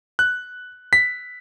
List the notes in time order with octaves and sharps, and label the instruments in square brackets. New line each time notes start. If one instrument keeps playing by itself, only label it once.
[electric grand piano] F#6
B6